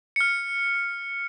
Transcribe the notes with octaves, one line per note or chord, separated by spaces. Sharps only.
F6 C#7